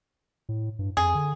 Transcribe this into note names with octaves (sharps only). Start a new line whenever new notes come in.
A2
G2
F2 G#4
D3